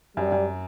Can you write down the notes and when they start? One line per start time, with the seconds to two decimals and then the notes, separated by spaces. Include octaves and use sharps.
0.17 F#2 G3
0.32 F#2